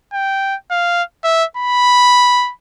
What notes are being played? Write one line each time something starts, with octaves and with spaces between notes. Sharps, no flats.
G5
F5
E5
B5